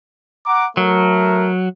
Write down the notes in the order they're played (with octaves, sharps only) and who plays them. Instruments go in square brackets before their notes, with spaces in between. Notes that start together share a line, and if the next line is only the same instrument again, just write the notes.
[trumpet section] F#5 A#5 D6
[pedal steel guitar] F#3 [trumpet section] A3 A#4